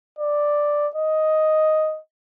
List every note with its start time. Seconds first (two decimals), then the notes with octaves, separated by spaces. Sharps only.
0.19 D5
0.95 D#5